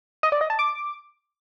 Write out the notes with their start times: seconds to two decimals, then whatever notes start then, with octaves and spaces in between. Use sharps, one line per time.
0.23 D#5
0.32 D5
0.41 D#5
0.50 A5
0.59 D6